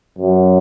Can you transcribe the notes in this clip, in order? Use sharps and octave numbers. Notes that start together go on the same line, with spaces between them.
F#2